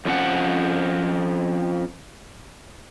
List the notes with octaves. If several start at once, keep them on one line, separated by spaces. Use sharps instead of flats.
F2 C#3 F3 C#4 F#5